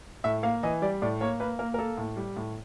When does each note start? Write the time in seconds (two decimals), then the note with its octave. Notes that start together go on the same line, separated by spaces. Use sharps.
0.24 A2 E5
0.43 A#3 F5
0.63 E3 D#5
0.82 G3 D5
1.02 A2 D5
1.21 A#3 C#5
1.40 A#3 B4
1.59 A#3 A#4
1.74 A#4
1.79 A#3 A4
1.98 A2
2.17 G3
2.37 A2